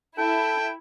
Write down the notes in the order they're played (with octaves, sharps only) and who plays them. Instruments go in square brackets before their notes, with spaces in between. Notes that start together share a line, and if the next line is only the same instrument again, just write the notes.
[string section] E4 [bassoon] A4 [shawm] G5